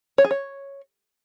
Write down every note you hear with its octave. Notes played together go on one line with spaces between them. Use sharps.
C#5
G#4
C#5